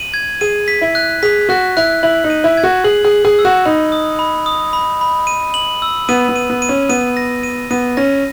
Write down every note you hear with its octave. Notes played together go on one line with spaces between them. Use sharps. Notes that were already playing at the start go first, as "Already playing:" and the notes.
Already playing: D#7 F#7
G#6
G#4 D#7
B6
E4
F#6
G#4 B6
F#4 F#6
E4 F#6
E4 F#7
D#4
D#7
E4
G#6
F#4
G#4 F#7
G#4
F#7
G#4
E6
F#4
D#4 B5
D#6
B5
D#6
B5
B5
D#7
F#7
E6
B3 D#7
B3
D#7
B3
D#7
C#4
B3 D#7
A#6
D#7
B3 D#7
C#4 A#6